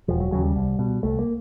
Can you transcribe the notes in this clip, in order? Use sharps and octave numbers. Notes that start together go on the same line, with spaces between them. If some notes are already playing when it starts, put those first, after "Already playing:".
E1 F3
F#3
D#2 C#3 F#3
G3
C2
B2
C2 A3
A#3